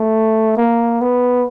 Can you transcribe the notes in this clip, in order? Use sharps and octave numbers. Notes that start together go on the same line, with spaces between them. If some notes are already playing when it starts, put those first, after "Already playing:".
Already playing: A3
A#3
B3